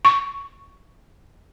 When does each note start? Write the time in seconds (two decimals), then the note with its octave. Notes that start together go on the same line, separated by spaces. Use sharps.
0.05 C#6